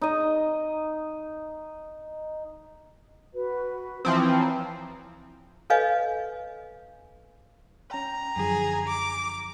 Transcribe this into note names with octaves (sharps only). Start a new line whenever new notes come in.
D#4 D#5
F#4 B4
E3 F3 C4 A5 D#6
G5
C#5 F5 A#5
A4 B4 C#5 D#5 F5 G#5
C#4 G5 A#5
F#2 D3 F3 G#4
D6